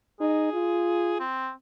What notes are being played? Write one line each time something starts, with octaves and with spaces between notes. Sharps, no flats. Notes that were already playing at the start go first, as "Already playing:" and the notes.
D#4 G#4
F4
C4